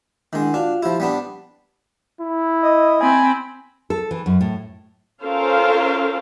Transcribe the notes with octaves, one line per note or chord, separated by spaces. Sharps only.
D#3 G#3 D4 E4 F#5
D4 F4 F#4 F5
F3 E4 G4
G3 B3 D4
E4
D#5
C4 G#5 B5
A4
E3
F#2
A2
C#4 F4 A4 A#4 C5 F5